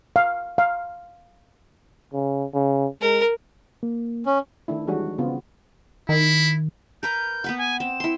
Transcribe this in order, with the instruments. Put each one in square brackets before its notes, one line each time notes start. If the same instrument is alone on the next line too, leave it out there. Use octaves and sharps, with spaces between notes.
[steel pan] F5
F5
[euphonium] C#3
C#3
[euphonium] G#3 [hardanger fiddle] A#4
[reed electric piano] A#3
[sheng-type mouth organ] C#4
[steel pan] D#3 A3 D4 E4
E3 G3 G#3 D4 F#4 C#5
C#3 B3 C4 F4
[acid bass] D#3 [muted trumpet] E4
[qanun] A#4 B4 A#5 [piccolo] G6
[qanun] B3 B4 F#5
[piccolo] G#5
[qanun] C4 [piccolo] E7
[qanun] E4 C6